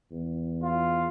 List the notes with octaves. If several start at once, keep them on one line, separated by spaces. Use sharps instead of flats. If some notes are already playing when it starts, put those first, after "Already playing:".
E2
F4